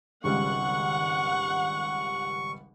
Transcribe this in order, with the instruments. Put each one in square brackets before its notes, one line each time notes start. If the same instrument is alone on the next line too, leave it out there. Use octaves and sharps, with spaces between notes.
[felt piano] G#1 C#2 G3 [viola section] F#5 [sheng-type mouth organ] C#6